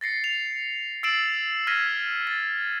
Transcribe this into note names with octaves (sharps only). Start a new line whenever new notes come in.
A6 A#6 C7 C#7
F7
E6 A6 C7 D7 E7 F#7
F6 G#6 A#6 B6 D#7
A6